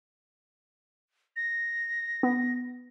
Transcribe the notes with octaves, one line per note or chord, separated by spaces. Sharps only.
A#6
B3